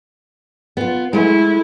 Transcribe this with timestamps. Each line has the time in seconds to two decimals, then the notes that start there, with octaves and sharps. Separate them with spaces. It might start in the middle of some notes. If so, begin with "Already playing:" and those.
0.77 B3 F4
1.13 G#3 A3 E4